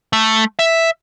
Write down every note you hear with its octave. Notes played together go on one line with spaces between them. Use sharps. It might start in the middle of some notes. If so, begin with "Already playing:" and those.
A3
E5